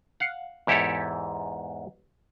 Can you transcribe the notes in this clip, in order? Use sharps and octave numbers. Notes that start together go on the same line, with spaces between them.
F5 F#5
E2 G#2 E4 G4 A4 C#5